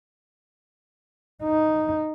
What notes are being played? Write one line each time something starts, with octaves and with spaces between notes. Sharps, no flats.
D#4